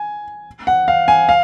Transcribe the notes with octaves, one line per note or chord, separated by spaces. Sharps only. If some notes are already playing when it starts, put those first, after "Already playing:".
Already playing: G#5
F#5
F5
G#5
F5